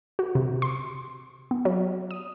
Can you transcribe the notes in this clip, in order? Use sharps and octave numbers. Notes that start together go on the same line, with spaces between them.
F#4
C3
C6
B3
F#3
D#6